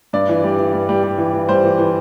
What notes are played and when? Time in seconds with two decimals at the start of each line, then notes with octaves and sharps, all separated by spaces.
0.13 G2 D5
0.29 E3
0.44 G3
0.58 E3
0.74 G2
0.89 G3
1.03 G3
1.18 E3
1.33 E3
1.49 G3 C5
1.64 E3
1.78 E3